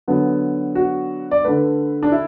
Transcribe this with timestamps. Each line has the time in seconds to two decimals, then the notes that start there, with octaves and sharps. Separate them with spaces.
0.08 D3 F#3 B3
0.75 F#4
1.31 D5
1.44 D3 A3 B4
2.03 D4
2.12 E4